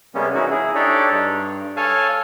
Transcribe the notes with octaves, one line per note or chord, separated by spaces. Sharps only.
C3 G3 G#3 A#3 B3 C#4
E3 G#3 C#4 D#4 E4 F#4
E4 G#4
D4 D#4 G4 A4 C#5 D5
G2
A4 C#5 F5 G#5 A5